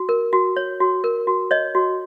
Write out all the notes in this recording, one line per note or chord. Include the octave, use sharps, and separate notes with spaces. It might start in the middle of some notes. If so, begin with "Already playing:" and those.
Already playing: F#4
A#4
F#4
C#5
F#4
A#4
F#4
C#5 D#5
F#4